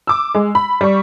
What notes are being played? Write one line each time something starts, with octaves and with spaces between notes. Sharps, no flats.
D6 E6
G#3
B5
G3 C#6